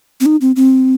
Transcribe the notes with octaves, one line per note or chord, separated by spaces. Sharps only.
C4
D#4
C4
C4